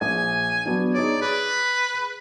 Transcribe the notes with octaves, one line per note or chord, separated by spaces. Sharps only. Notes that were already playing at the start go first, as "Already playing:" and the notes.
A#1 G#5
F#3 B3 D4
D#4 G#4 C#5 D5
G#4 B4